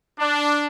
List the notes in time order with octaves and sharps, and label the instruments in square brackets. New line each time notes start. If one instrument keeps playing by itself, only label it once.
[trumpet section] D4